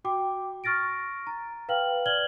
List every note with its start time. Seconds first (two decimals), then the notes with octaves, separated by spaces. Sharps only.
0.05 F#4 G5 D6
0.64 C#6 F6 A6 A#6 D7
1.27 A#5
1.69 B4 F5 G5 F6 F#7
2.06 D5 F6 G#6 F#7 G7